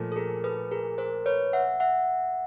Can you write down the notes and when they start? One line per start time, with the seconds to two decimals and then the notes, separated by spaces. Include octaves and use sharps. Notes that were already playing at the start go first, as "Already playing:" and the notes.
Already playing: A#2 F3 A3
0.12 A4
0.16 G#4 A#4
0.44 A4 B4
0.71 G#4 A#4
0.98 A#4 C5
1.26 B4 C#5
1.53 E5 F#5
1.80 E5 F#5